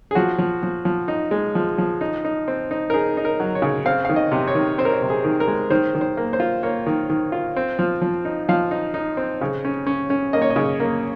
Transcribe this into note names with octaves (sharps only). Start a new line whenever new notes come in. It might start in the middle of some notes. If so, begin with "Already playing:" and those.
G#4
F3 F#4
F3
F3
F3
D#4
G#3
F3
F3
D#4
D#4
C4
D#4
A#4
D#4 G#4
D#4
A#4
F#3
C#5
C#3
C4 F5
D#3 F5
D#5
C3
C#5
D#3
C4 C5
A#4
C5
C3
G#4
D#3
A#4
G#3
D#3 C5
D#3
C5
A#3
C5
F4
A#3 C#5
D#3
D#3
F4
C4
F3
F3
D#4
F3 F5
D#4
D#4
C4
C#3
C#4
C#4
C#4
A#3 D#5
C#5
D#5
C#3
A#3